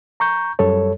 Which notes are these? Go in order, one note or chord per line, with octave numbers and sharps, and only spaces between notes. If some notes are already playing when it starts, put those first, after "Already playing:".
A#5 C#6 G6
F#2 G3 A4 C#5